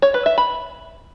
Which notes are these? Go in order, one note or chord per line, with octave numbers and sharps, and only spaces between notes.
C#5
B4
E5
B5